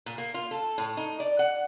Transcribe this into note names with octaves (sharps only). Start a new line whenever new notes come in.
A#2
A#3
F4
A4
A2
D#4
D5
F#5